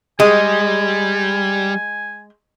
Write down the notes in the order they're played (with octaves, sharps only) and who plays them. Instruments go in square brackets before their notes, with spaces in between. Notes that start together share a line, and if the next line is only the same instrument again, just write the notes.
[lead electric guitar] G3 [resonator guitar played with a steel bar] G#3 [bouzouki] D#5 [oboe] G#5